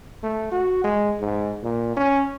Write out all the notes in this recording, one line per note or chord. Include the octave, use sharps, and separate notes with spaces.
A3
F#4
G#3
G#2
A#2
C#4